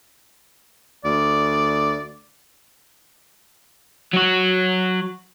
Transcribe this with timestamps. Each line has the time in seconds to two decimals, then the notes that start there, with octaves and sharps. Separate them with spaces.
1.04 D2 D5
4.13 F#3 F#4